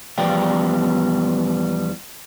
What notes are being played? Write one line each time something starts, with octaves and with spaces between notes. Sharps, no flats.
E2 F3 G3 B3 D5 G5